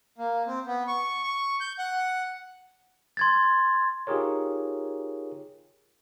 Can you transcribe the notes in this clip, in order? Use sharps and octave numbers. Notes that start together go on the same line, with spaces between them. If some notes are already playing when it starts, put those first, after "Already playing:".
A#3
C4
B3
C#6
C#6
G6
F#5
C6 G#6 A6
D#4 F4 G4 G#4 A#4 C#5